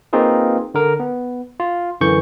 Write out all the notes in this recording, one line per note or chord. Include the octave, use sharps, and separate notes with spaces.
A#3 C4 D#4 F4 G#4 B4
D3 A#4
B3
F4
F#2 D3 E3 C#6 G6